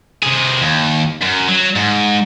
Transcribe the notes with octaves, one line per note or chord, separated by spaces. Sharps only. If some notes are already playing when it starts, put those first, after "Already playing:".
C3 G#4
D#2
F#2
F#3
G#2